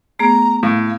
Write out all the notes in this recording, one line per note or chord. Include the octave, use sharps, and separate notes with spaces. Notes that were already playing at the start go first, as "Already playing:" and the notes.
A3 B3 G#4 A#5
A2 F5